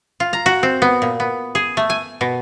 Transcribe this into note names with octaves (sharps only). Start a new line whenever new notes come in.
F4
A#5
F#4
C4
B3
A#2
B3
G#4
A3
G#5
B2